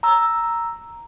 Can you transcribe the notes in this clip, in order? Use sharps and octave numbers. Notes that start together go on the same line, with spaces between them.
A#5 E6